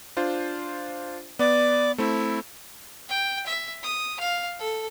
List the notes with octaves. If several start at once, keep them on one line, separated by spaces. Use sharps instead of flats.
D4 F4 C5
B3 D5
A3 C4 E4
G5
E5
D#6
F5
A4